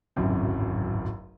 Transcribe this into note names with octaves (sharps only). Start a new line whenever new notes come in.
D1 G#1 F#2 C3